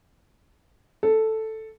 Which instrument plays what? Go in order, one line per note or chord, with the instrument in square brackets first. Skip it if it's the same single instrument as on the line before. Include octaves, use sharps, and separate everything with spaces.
[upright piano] A4